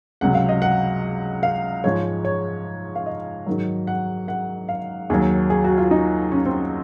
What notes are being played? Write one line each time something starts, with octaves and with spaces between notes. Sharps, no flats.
C#2 C3 F#3 F#5
F5
D#5
F#5
F5
G#2 F3 G#3 C#5
C#5
F5
D#5
G#2 D#3 F#3
F#5
F#5
F5
D#2 D#3 F#3 G#4
G#4
F#4
F4
D#4
C#4
C4